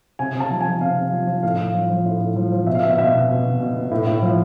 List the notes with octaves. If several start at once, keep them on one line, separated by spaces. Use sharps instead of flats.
C3 G#5
C3
A5
F3
F3 G#5
C3 F5
C3
F3
F3
A2 F5
A2
F3
F3
A2
A2
F3
F3
B2 E5
F5
B2 E5
B2 E5
B2
B2
B2
B2
B2
A2
A2
F3